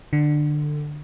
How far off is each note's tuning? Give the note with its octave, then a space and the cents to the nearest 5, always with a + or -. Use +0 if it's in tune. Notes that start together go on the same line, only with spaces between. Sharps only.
D3 +20